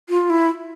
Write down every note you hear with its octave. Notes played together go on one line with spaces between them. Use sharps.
F4
E4